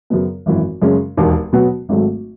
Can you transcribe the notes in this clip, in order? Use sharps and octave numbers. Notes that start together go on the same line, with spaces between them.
F#2 C#3 F#3 B3
G#1 F#2 E3
F#2 C#3 G#3 C#4
E1 D#2 D#3
B2 F#3 B3 F#4
G#1 G#2 F#3 A3